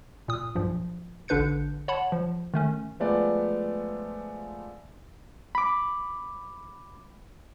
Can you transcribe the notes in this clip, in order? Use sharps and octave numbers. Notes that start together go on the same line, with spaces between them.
A#2 D#6
B1 G2 A#2 F3
A1 D3 D4 B4 G6 C#7
C#5 F#5 A5 B5
F3
D#3 A3 C#4
F3 G#3 A3 B3 D5
B5 D6